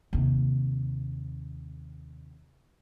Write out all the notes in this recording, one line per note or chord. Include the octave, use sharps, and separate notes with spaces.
D#2 C3